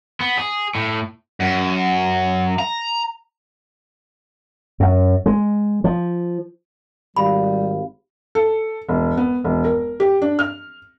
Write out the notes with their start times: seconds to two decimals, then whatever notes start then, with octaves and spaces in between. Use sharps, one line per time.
0.20 B3
0.37 G#4
0.75 A2
1.40 F#2
2.59 A#5
4.80 F#2
5.26 G#3
5.84 F3
7.17 G#1 G3 G4 F5 B5
8.35 A4
8.88 E1
9.17 B3
9.44 E1
9.65 A#4
10.00 G4
10.22 D4
10.39 F6